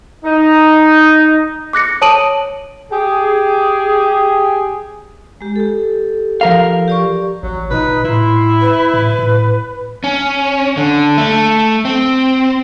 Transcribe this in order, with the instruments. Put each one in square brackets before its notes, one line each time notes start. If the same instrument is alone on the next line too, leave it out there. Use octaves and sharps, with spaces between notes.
[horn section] D#4
[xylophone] D6 F#6 A#6 C#7
C#5 A5 D#6 D7 D#7 F#7
[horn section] G4 G#4
[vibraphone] G#3 G4
G4 A4
[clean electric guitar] F3 A#4 F5
[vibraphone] G4 D5 C#6
[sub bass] A1 [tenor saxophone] F#3
[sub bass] A#2 [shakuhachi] D#4 [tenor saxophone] B4
[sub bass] A2 [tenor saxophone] E4 [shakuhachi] C6
[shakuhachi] B4
[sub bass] A2
A2
[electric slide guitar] C#4
D3
A3
C4